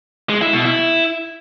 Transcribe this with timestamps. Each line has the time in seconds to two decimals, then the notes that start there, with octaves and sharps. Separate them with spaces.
0.29 G#3
0.41 E4
0.53 B2
0.65 E4